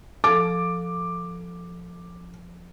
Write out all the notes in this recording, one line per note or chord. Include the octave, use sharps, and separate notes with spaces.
F3 A4 D6